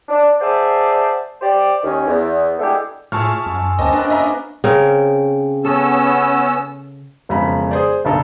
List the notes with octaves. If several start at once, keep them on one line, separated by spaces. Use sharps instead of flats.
D4
G#4 C5 D5 E5 F#5 A5
G4 C5 D5
D#2 D#3 C#4
E2
G#3 A3 B3 D4 E4 G4
A2 F4 G#4 E5 A5 C#6 F6
F#2
D2 A#3 C4 C#4 D#5 A5
A#3 D4 B4
D#5 E5 A#5
C#3 C4 A#4
B3 C#4 A4 E6
E1 F2 C#3 A#5 B5
G#4 C5 D5
F#1 B1 C#3 D4 A4 A#5